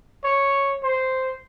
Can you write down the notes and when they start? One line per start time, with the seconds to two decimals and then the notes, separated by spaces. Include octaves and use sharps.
0.24 C#5
0.83 C5